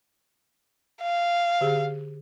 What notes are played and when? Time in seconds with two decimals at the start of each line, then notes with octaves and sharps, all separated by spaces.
1.03 F5
1.61 D3 G4 G#4